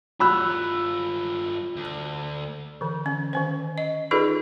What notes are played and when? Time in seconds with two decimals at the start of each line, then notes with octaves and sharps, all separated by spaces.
0.20 G2 F4 B5 E6 F#6
1.76 D2
2.81 D3 E3
3.06 C#4
3.33 D#3 C#4 C5
3.78 D#5
4.11 D#4 F4 G#4 A4 B4 D5